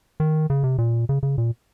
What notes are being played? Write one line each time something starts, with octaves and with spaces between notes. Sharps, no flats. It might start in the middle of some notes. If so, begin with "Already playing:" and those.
D#3
C#3
C3
A#2
C#3
C#3
A#2